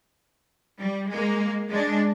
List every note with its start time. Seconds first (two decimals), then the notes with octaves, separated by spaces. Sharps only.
0.79 G3
1.09 G#3 A#3
1.69 G#3 D4